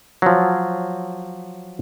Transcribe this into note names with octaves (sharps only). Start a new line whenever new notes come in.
F3 F#3